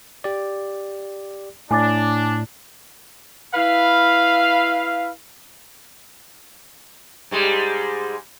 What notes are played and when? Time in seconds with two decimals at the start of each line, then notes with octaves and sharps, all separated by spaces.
0.24 G4 D5
1.71 A2 D4 G#5 D6 A6
3.55 E4 B4 F5
7.31 G#2 G3 G#3